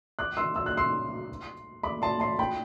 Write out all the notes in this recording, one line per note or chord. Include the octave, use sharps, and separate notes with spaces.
D6 F#6
C6 E6
E6
F#6
C6 E6
B5 D6
A5 C6
A5 C6
G5 B5